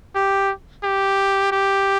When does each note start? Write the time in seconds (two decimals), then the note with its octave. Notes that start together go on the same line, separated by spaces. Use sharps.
0.15 G4
0.83 G4
1.52 G4